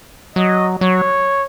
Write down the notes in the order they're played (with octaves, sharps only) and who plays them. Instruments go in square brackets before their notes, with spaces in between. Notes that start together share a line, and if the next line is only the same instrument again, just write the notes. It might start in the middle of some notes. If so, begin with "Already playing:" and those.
[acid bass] F#3 [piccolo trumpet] D#5
[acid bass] F#3 [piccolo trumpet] C#5